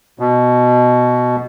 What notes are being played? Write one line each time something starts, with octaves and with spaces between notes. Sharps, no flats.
B2